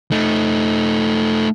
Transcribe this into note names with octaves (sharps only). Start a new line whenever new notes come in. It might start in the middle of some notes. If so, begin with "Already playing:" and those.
A3 D#4